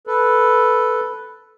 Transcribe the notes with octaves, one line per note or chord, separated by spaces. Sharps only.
A4 B4